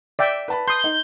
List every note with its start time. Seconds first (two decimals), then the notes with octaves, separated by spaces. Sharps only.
0.19 D5 E5 G5
0.48 B4 A5 B5
0.68 C6 D#6 G6
0.84 D#4